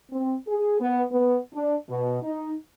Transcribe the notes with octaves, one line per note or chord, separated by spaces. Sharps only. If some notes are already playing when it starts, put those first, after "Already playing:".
C4
G#4
B3
B3
D4
B2
D#4